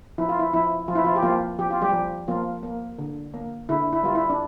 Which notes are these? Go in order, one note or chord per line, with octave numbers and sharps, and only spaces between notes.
F3 E4
F4
E4
F3 E4
F3 F4
E4
F3 F4
G4
F3 A#3 F4
F3 G4
F4
G3 G4
F3
F3 A#3 F4
A#3
D3
A#3
D3 E4
E4
G3 F4
E4
D4